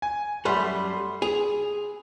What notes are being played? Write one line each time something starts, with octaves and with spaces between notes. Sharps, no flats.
G#5
F#2 G3 A3 B5 C6
G#4 F7